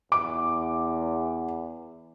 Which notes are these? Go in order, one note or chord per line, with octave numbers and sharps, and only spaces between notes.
E2 D6